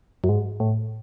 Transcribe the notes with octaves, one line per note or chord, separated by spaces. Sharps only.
F#2
G#2
A2